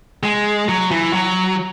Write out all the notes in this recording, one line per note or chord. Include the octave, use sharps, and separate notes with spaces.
G#3
F#3
E3
F#3